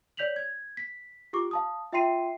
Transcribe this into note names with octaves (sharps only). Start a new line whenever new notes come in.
C#5 D5 G6 B6 F7 F#7
G#6
B6
F4 G4 C#6 D6
F5 A5 D#6
F4 E5 G5 C6 C7 D#7